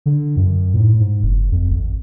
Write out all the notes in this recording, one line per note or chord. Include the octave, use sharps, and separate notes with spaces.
D3
F#2
A2
G#2
F#1
F2
G#1